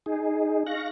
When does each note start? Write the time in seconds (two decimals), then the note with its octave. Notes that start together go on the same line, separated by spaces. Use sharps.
0.06 D#4 G#4
0.66 F5 C#6 F#6 A#6